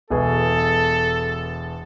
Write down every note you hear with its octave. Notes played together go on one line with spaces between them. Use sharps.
E1 B2 G#4 A4